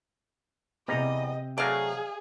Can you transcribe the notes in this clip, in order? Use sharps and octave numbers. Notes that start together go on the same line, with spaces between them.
E2 C3 G3 C4 D#5 A#5
F#3 A3 G#4 D5 D#5 F5